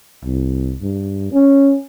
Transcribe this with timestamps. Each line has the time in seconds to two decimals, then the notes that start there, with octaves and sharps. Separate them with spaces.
0.24 C2
0.81 G2
1.32 C#4